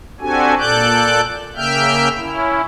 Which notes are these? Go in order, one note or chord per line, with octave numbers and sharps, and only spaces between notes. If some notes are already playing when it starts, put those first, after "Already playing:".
C4 D4 F#4 G4 A4 G#5
A#2 A4 D5 D6 F#6 G6
C#3 A#3 E5 G5 F6 G6
C#4 E4